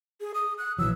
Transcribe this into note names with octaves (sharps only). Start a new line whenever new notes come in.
G#4
D#6
F#6
A#1 E3 F#3 E6